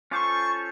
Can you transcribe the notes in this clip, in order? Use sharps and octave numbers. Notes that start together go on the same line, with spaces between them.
C#4 F4 A4 C5 C#6 D6